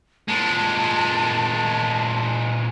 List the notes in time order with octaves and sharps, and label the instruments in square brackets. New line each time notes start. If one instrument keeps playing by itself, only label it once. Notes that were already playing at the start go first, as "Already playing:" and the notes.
[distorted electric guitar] A#2 G#3 [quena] A5